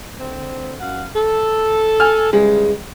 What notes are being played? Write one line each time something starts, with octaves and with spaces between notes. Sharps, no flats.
D3 C4
F#2 F5 F#5
A4
G#5 F6
C#3 E3 G3 G#3